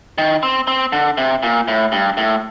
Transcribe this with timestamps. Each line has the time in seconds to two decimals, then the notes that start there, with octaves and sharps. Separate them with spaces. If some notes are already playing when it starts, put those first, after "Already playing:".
0.18 D#3
0.43 C4
0.67 C4
0.92 D3
1.17 C3
1.43 A#2
1.68 A2
1.92 G2
2.17 A2